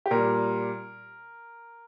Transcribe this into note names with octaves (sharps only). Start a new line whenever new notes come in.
G4
A#2 G3 A#4